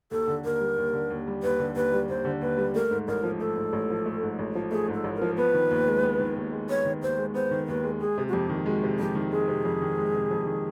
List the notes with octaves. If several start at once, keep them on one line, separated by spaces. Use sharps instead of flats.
D#2 A4
D3
D#2 A#4
G3
D#2
D3
D#2
G3
D#2 B4
D3
D#2 B4
G3
D#2 C5
D3
D#2 B4
G3
A3 A#4
G#2
A1 A#4
F3
A3 A4
G#2
A1
F3
A3
G#2
A1
F3
A3 G#4
G#2
A4
A1
A#4
F3
B3 B4
D#3
D#2
G#3
B3
D#3
D#2
G#3
B3 C#5
D#3
D#2 C5
G#3
B3 C5
D#3
D#2 B4
G#3
G#3 G#4
C3
F#4
F2 G4
D#3
G#3 F#4
C3
F2 G4
D#3
G#3 G#4
C3
F2
D#3
G#3
C3
F2
D#3